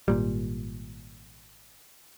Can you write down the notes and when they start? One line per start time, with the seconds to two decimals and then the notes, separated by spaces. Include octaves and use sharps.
0.08 G#1 A#2 G3